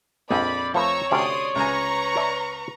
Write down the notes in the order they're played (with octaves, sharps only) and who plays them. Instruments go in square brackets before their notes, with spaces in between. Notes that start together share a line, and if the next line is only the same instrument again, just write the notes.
[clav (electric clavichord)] A#1 [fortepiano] F2 D#5 [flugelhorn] D5 [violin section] B5
[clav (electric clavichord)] F3 A3 B4 [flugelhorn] C#5 [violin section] A#5 C#6 E6
[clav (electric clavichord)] D2 C3 C#4 [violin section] D5 C6 D#6
[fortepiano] C#2 G#5 [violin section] B4 A#5 C#6
[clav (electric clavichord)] D5 E5 A5